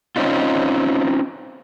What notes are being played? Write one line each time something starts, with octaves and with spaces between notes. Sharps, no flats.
C4 C#4 D#4 F4